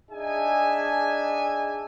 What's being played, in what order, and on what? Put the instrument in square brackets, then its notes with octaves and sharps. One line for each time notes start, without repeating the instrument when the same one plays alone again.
[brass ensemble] D4 D#4 G#4 E5 G#5